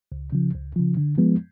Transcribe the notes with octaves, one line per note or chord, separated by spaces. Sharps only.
C#2
C#3 F3
C#2
C#3 F3
D3
F3 G#3 B3